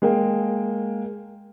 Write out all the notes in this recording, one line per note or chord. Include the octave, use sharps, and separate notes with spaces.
G#3 A#3 G5